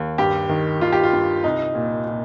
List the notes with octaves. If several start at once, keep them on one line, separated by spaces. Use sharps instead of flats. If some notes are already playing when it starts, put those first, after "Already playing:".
Already playing: D#2
G2 G4
D#3
D#3 F4
G4
F4
G2
C2 D#4
A#2
A#2